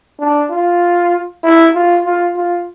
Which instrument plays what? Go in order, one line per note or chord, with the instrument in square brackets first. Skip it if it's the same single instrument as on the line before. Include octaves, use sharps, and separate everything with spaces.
[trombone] D4
F4
E4
F4
F4
F4